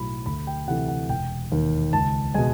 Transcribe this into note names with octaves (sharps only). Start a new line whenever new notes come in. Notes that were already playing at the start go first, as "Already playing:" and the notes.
Already playing: B1 A2 F#3 B5
D2 B5
G5
C3 E3 A3 F#5
F#5
E1 G5
D#2 D#3
C#2 A5
B2 G#3 G#5